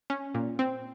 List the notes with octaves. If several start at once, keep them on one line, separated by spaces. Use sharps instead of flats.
C#4
A#2
C4